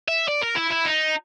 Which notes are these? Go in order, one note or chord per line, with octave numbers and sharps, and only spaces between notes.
E5
D5
A#4
E4
E4
D#4